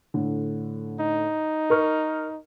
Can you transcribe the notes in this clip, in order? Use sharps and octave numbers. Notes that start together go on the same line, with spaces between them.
A2 D3
D#4
A#4 C#6 F6